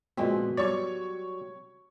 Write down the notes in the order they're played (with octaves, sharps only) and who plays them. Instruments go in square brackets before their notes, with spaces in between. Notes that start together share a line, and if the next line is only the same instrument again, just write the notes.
[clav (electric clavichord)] A#2 G#3 C4 [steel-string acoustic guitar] D3 F3 B3 [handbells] F#4
[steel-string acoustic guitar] F#3 G3 [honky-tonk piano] C#5 C#6 [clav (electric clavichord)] D5